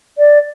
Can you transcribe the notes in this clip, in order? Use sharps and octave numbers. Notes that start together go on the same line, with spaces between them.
D5